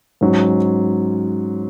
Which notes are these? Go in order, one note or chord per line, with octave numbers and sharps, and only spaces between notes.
G#2 F#3 C#4